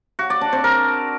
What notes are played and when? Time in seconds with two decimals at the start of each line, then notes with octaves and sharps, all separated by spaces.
0.19 F#4
0.30 D5
0.41 D4
0.53 C4
0.64 A#4